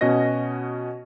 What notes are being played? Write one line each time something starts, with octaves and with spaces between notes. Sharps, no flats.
B2 C#4 F#4 D#5 A#6